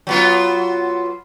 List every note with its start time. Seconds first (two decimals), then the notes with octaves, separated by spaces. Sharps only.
0.07 F#3 B3 F4